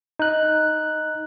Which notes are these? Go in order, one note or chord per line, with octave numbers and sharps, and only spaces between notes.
D#4 F#6